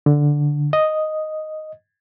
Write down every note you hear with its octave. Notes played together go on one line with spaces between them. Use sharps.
D3
D#5